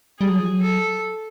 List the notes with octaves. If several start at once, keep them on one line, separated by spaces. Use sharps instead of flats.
G3 G#4
F#3
F3
F#3
A4